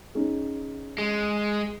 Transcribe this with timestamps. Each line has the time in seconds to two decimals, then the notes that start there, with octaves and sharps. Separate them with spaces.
0.15 C#4 D#4 G#4
0.98 G#3